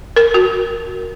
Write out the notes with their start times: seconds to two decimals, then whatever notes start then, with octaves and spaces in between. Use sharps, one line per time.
0.16 A#4
0.34 F#4